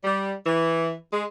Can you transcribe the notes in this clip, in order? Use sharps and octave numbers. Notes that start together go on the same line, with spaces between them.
G3
E3
G#3